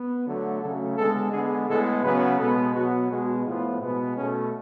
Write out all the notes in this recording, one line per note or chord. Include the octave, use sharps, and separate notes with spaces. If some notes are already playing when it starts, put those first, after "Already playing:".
Already playing: B3
D3 F#3 A3
C#3 F#3 A3 A4
D3 G#3 B3 A4
D3 G#3 B3 G#4
A2 G#3 B3 A4
C#3 F#3 B3 B4
B2 G#3 B3 A4
B2 F#3 B3 F#4
B2 G#3 B3 F#4
A2 F3 B3 F4
B2 G#3 B3
B2 A3 C#4